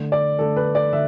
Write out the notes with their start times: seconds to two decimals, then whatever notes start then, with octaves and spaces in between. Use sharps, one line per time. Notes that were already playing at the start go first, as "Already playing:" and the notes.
Already playing: D3 A3
0.12 D5
0.39 D3 A3 A4
0.56 B4
0.75 D5
0.92 D3 E5